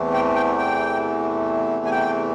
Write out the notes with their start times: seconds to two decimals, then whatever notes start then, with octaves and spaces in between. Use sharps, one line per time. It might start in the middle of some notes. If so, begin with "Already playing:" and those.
Already playing: E2 C3 E3 A3
0.14 G5
0.35 G5
0.58 G5
1.85 G#5
1.91 G5